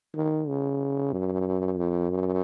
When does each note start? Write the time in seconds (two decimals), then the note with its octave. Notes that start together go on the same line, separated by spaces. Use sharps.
0.16 D#3
0.48 C#3
1.13 F#2
1.77 F2
2.10 F#2